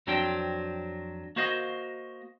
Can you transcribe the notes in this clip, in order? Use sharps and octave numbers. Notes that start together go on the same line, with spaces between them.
F2 F#3 C4 D4 C5 G5
A#3 F#4 C5 D#5 F5